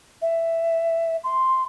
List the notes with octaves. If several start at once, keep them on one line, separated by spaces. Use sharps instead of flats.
E5
C6